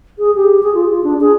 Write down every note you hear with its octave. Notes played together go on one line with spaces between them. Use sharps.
G#4
G4
G#4
F4
F4
D4
G#4